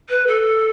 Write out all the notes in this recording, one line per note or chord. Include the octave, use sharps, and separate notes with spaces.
B4
A4